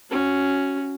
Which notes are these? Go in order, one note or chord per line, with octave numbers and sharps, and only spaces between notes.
C#4 F#4